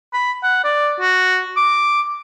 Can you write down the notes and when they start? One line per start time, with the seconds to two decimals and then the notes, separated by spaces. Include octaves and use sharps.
0.14 B5
0.43 F#5
0.64 D5
1.00 F#4
1.57 D6